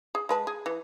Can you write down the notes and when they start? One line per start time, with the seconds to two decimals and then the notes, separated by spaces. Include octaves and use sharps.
0.15 G#4
0.29 G#3 B4 A5
0.47 G#4
0.66 E3